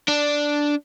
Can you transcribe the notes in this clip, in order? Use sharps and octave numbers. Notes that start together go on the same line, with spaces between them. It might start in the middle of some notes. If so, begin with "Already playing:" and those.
D4